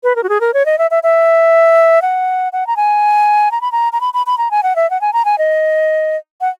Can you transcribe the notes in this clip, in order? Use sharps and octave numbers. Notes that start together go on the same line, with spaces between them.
B4
A#4
F#4
G#4
A#4
C#5
D#5
E5
E5
E5
F#5
F#5
A#5
G#5
A#5
B5
A#5
A#5
B5
B5
B5
A#5
G#5
F#5
E5
F#5
G#5
A#5
G#5
D#5
F#5